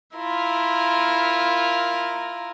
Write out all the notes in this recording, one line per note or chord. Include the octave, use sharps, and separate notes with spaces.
E4 F4 A#4